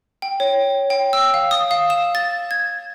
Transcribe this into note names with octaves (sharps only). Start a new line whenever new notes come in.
G5
C#5
G5
E6
F5
D#6
F5
E7
A6
G#6